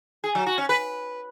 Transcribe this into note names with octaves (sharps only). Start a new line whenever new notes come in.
G#4
F#3
F#4
C#4
B4